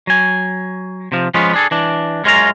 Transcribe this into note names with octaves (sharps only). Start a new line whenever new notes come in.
F#3 G#5
C3 F3
F3 G#3 B3 C#4 F4
D4 G#4 A4
E3 D4
F#2 G#3 C#4 F4 A#5